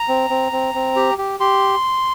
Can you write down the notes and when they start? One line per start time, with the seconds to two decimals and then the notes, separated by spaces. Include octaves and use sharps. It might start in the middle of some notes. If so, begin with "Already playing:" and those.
Already playing: A#5
0.08 C4
0.30 C4
0.52 C4
0.74 C4
0.96 G4
1.18 G4
1.40 G4 C6